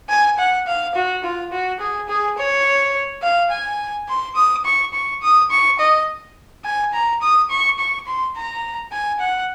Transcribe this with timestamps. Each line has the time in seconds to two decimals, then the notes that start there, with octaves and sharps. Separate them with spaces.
0.09 G#5
0.38 F#5
0.67 F5
0.95 F#4
1.24 F4
1.52 F#4
1.80 G#4
2.09 G#4
2.38 C#5
3.23 F5
3.51 G#5
4.09 C6
4.36 D#6
4.65 C#6
4.94 C#6
5.22 D#6
5.50 C#6
5.80 D#5
6.65 G#5
6.93 A#5
7.22 D#6
7.50 C#6
7.79 C#6
8.06 C6
8.36 A#5
8.92 G#5
9.20 F#5